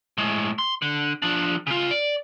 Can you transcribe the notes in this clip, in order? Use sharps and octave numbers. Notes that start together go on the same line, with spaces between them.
A2 G#3
C6
D3
F3 D4
C#3 F4
D5